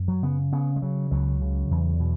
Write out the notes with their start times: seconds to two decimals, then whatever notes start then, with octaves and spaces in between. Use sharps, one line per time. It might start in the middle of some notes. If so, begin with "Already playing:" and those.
Already playing: F#2
0.08 F#3
0.23 C#3 B3
0.52 C#3 B3
0.76 G#3
0.82 C#3 F#3
1.11 C#2 F#3
1.41 C#3
1.71 E2
2.00 B2